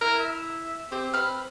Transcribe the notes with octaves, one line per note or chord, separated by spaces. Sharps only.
E4 A#4
E5
C4 G4
B4 F6